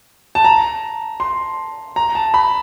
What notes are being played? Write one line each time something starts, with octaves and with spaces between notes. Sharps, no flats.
A5
A#5
C6
A#5
A5
B5